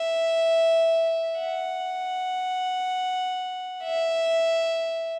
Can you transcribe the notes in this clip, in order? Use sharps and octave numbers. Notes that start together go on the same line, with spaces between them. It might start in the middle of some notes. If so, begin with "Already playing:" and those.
Already playing: E5
F#5
E5